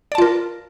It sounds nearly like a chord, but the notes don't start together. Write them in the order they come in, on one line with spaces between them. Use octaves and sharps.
D5 A5 F4 A#4